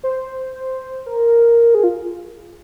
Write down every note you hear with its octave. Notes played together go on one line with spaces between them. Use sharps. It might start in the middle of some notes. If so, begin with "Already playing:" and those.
C5
A#4
G#4
F4